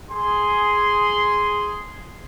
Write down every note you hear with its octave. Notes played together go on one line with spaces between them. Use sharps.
G#4 C6